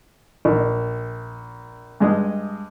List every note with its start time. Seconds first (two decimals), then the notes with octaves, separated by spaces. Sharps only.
0.45 A#1
2.00 G2 G#3 D#5